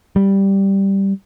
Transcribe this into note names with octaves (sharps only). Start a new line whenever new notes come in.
G3